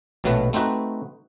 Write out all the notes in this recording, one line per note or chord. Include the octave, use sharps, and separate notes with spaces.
A#1 B2 F#3 A3 B3 B4
A3 C4 D#4 F#4 B4